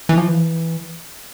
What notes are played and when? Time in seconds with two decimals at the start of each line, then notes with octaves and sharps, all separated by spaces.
0.09 E3
0.17 F3
0.27 E3